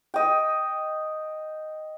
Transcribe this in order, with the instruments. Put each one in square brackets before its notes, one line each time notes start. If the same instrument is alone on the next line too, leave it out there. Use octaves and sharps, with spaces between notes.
[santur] D#5 G5